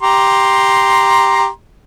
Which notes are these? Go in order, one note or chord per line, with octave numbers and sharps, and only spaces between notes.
G4 A#5 C6